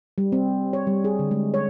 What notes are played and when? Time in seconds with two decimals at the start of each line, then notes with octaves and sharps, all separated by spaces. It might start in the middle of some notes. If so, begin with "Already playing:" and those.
0.18 G3
0.32 C4
0.73 C#5
0.87 G3
1.04 G#4
1.19 D3
1.31 G#3
1.54 C#5